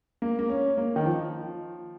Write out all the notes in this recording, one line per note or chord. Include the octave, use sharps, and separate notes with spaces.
A#3
A#3
C#4
A#3
D#3
F3